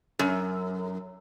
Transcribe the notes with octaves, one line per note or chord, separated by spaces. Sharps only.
F#2